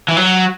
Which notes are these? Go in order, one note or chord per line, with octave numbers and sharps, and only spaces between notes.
E3
F#3